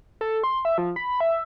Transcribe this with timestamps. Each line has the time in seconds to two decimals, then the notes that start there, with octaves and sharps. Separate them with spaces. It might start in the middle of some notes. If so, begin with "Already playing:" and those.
0.21 A4
0.44 C6
0.65 E5
0.78 F3
0.96 B5
1.20 E5